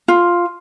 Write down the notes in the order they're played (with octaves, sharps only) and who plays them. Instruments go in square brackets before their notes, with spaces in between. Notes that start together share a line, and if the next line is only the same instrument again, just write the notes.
[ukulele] F4